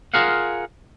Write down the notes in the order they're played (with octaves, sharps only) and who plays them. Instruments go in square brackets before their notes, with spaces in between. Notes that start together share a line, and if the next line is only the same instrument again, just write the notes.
[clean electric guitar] F4 G#4 A#4 F5 F#5